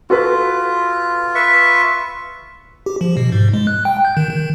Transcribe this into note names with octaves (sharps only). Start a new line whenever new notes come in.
F4 F#4 A4 B4
B4 E5 C#6
G4
F3
B2
G#2
G#3
F#6
G5
G6
D#3
D#3